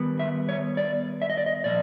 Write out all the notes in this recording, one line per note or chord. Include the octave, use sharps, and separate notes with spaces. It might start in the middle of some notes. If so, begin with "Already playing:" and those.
Already playing: D#3 G3 B3
E5
C#5
D5
E5
D#5
D5
D#5
A#2 F3 A#3 D5